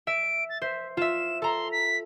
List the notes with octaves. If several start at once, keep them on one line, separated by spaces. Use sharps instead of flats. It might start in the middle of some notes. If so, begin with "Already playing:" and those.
E5 D7
A6
C5 E5
F4 E5 E7
A4 A#5 C6
B6